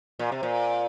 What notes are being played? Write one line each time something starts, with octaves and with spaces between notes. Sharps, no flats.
A#2
C3
A#2